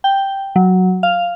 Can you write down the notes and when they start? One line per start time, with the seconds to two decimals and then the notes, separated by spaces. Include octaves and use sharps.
0.04 G5
0.56 F#3
1.03 F5